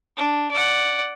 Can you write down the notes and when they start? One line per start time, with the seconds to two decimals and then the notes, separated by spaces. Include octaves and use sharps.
0.17 D4
0.51 D5 F#5